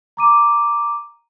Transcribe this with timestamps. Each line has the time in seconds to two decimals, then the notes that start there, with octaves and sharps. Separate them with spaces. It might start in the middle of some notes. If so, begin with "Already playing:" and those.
0.17 A#5 D6 D#7